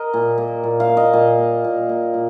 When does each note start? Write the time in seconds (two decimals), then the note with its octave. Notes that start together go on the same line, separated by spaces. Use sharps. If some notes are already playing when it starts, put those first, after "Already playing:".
Already playing: A#4 D#5
0.14 A#2
0.38 A#3
0.63 A#2
0.80 F5
0.88 A#3
0.97 D#5
1.13 A#2 D#5
1.38 A#3
1.64 A#2
1.89 A#3
2.14 A#2